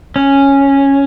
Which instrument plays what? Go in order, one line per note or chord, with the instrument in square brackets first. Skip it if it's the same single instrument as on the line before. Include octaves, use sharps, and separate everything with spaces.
[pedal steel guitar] C#4